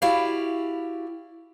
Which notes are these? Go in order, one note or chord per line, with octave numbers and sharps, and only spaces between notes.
E4 F#4 G4 D5 F5